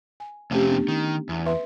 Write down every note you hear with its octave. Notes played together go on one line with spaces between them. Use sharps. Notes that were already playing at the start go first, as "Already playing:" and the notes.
G#5
F2 C3 A3 C4 C#4 G4
B3 D4
D#3
E2
B4 E5 C6